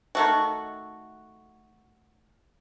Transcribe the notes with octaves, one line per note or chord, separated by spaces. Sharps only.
D#3 A3 F#4